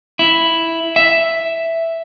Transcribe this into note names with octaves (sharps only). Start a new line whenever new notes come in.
E4
E5